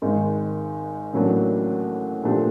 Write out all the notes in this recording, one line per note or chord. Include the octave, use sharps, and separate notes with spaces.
G#1 G#2 D#3
A1 A2 F#3 A#3 D4
A#2 F3 A3 D4 G4